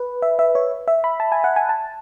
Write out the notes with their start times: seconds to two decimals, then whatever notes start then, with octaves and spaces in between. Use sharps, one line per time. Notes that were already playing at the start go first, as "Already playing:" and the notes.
Already playing: B4
0.22 E5
0.39 E5
0.55 C#5
0.88 E5
1.04 B5
1.20 A5
1.32 G#5
1.44 F#5
1.56 G#5
1.69 A5